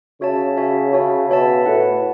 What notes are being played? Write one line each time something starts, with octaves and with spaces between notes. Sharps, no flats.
C#3 F#4 C#5 E5 A5
F#4 C#5 E5 A5
C#3 F#4 C#5 E5 A5
B2 F#4 C#5 E5 A5
A2 E4 B4 F#5